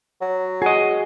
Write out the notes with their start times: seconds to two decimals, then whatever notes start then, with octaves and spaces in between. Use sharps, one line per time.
0.21 F#3
0.62 F#4 G#4 D#5